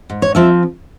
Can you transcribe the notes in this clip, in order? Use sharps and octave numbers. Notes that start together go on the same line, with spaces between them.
G#2
C#5
F3 C4 E5